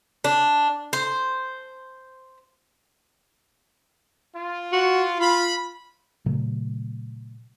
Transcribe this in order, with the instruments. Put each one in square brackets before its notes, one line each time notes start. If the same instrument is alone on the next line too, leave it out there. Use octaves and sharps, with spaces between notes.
[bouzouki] D4
C5
[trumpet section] F4
[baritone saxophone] F#4
[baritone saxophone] F4 [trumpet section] B5
[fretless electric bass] A#2 C#3 F#3 A3